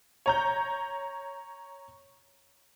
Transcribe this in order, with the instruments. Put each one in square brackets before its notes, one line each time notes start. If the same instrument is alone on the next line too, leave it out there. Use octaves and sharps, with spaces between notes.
[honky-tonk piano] C#5 A#5 G6